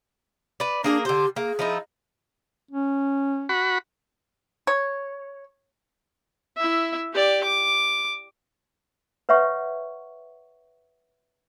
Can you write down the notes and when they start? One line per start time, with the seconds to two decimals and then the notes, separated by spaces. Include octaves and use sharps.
0.60 B4 D5
0.84 A#3 D4 G#4 A#4
1.05 D3 G4 C5
1.36 A#3 G#4
1.59 F3 D#4 E4
2.71 C#4
3.49 F#4 B5
4.67 C#5
6.57 E4 E5
7.13 G4 D5
7.44 D6
9.29 B4 C#5 E5 F#5 C#6